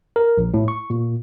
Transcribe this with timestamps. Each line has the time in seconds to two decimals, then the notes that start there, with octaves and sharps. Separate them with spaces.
0.16 A#4
0.38 A#1
0.54 A2
0.68 C#6
0.90 A#2